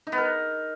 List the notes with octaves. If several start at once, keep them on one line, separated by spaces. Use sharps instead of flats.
D#4
B3
A#4